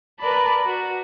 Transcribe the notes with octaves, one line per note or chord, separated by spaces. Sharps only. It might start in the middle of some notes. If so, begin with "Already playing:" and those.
A#4 B4 D5 A5 B5
F#4